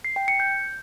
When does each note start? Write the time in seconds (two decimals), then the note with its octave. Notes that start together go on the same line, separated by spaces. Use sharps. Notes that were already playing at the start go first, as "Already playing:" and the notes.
0.05 C7
0.16 G5
0.28 C#7
0.40 G6